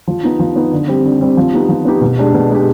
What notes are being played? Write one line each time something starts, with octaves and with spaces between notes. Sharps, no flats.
F3
B3 D#4
F3
B3 D#4
D3
G3 C4 G4
D3
G3 C4 G4
F3
B3 D#4 G4
F3
B3 D#4 G4
B2
G#3 D4 G4
B2
G#3 D4 G4